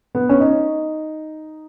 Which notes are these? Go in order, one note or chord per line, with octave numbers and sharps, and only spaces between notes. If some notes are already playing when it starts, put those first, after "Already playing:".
B3
C#4
D#4